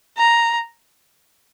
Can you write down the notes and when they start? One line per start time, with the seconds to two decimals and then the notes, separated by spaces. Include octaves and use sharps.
0.18 A#5